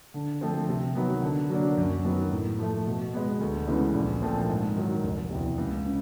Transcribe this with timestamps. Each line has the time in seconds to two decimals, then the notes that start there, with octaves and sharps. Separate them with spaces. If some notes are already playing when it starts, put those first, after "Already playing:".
0.14 D3
0.41 F3 A3 C4
0.69 C3
0.95 D#3 F#3 B3
1.22 D3
1.50 F#3 A#3 D4
1.77 F#2
2.05 D#3 F#3 B3
2.32 A2
2.59 F3 A3
2.86 B2
3.13 G#3 B3
3.40 D2
3.67 C#3 E3 G#3 B3
3.94 A#1
4.22 A#2 F3 A3 C4
4.49 G#2
4.76 D#3 F#3
5.03 F1
5.31 E2 C3
5.58 C#2
5.85 C#3